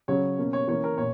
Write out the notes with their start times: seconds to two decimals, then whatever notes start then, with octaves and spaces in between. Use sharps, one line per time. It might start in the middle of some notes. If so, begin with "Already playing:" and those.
0.08 C#3 F#3 C#4 C#5
0.38 B2 A#3 C#4
0.53 C#5
0.67 E3 A#3 C#4 C#5
0.84 A#4
0.98 A#2 C#5